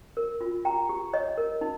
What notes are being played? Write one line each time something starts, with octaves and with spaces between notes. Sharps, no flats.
A#4
F4
G4 G5 A#5
G4
C#5 D#5
A#4
D#4